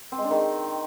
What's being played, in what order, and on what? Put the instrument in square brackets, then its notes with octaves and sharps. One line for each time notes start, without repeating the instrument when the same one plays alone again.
[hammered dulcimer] C4
G#3
D4
D#3